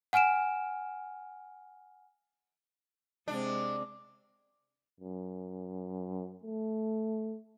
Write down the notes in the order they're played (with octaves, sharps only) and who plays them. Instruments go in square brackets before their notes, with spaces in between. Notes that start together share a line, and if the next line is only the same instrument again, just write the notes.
[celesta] F#5 G#5 F6 D7 E7
[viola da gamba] C3 G#3 C4 [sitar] D4
[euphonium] F#2
A3